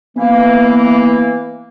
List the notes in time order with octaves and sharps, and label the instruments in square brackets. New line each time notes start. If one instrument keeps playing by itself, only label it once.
[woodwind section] E3 A#3 [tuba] B3